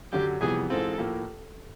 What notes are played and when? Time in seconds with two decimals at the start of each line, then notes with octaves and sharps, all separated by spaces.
0.12 F#2 D3 F#3 G4
0.41 F2 C3 E3 G3 B3 G#4
0.70 G#2 E3 G#3 C4 F4 A4
0.98 A2 F3 A#3